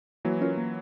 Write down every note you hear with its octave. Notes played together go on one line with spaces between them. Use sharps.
E3 F#3 A#3
C#4 F4 A#4 C#5
A#3